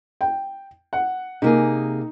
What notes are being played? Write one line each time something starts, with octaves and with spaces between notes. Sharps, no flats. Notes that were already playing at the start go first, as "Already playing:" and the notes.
G5
F#5
C3 A#3 D#4 G#4